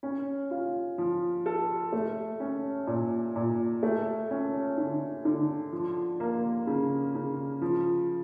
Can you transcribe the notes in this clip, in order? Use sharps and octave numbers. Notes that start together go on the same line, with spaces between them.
C#4
F4
F3
A4
A3
C#4
A#2
A#2
A3
C#4
D3
D3
F3
A#3
C#3
C#3
F3